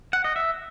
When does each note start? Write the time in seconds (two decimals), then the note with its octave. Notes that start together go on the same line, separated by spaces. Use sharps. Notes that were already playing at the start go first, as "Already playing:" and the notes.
0.13 F#5
0.24 D#5
0.36 E5